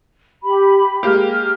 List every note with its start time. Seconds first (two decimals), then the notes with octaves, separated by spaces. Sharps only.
0.43 G4 B5
1.03 G#3 A#3 G4 F6